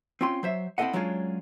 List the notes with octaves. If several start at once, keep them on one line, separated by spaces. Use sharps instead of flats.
C4 C#4 F4 G5 C6
F#3 C5 E5
C4 E4 F4 A4 D#5 F#5
F#3 G#3 C#4 D4 F4 G#4